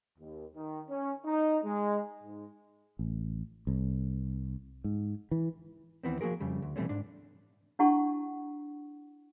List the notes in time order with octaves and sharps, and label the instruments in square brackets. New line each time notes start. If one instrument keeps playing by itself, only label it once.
[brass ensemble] D#2
D#3
C#4
D#4
G#3
G#2
[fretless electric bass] A1
C2
G#2
E3
[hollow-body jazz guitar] D#2 E3 B3 C4
F3 A#3 F#4 G#4 A#4
F2 C#3 G3
D2
B2 E3 G3 A3 C4 C#4
G#2 D4
[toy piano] D4 E4 G4 F#5 A5 C#6